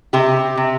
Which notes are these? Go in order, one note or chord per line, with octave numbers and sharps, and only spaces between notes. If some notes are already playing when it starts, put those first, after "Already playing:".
C3 G4
C3